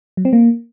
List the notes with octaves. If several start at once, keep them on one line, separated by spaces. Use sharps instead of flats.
F#3
C4
A#3